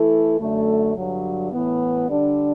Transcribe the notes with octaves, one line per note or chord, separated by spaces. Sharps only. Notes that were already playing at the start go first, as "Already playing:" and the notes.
Already playing: E3 A3 E4 A4
F#2 D3 A3
G2 D3 F#3
A2 E3 B3
D3 G3 D4